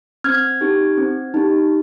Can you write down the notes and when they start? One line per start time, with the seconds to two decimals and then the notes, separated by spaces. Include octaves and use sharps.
0.24 C4 F6 G#6
0.61 D#4 G4
0.97 C4
1.34 D#4 G4